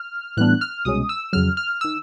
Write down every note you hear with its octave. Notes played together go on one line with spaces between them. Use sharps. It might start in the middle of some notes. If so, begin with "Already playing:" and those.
Already playing: F6
A2 E3 G3 B3 D4 F#6
F6
C2 B2 G#3 C#4 D#6
E6
F2 C#3 F#3 F6
F6
D#3 E6